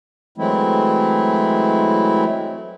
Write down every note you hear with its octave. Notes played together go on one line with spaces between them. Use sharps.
E3 F#3 G#3 A3 C4 E4